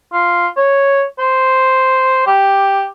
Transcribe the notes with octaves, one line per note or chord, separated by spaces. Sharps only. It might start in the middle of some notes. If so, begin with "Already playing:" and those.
F4
C#5
C5
G4